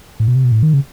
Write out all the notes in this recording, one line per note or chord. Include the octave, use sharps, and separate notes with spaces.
A2
B2
C3
B2
A2
D#3
C#3